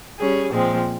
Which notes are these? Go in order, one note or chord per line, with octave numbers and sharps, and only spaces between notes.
G3 C#4 G#4
A#2 F3 G#3 C4